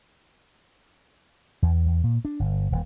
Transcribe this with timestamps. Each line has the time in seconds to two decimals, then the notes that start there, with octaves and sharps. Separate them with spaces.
1.62 E2
1.85 E2
2.04 A#2
2.25 D4
2.40 G1
2.72 D#1